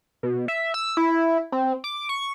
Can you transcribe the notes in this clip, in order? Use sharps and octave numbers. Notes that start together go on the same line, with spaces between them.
B2
E5
E6
E4
C4
D6
C#6